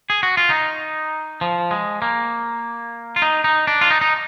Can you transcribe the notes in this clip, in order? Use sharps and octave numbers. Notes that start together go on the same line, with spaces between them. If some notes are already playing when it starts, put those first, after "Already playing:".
G#4
F#4
F4
D#4
F3
G#3
A#3
F4
D#4
D#4
D4
F4
D#4
D#4